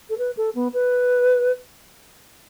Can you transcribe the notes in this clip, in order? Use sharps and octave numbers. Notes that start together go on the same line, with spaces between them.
A4
B4
A4
B3
B4